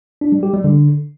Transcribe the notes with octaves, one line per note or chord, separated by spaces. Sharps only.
D4
G3
G4
G3
D3